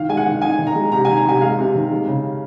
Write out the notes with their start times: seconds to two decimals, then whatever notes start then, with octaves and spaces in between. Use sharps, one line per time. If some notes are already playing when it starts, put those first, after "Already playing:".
Already playing: D#3 F5
0.09 G#3 G#5
0.17 F#5
0.26 D#3
0.42 D#4 G#5
0.59 D#3
0.67 A#5
0.75 G#3
0.92 C3 A#5
1.05 G#5
1.09 D#3
1.17 A#5
1.25 C3 G#5
1.41 G#3 F5
1.58 C3
1.75 D#3
1.91 G#3
2.08 C#3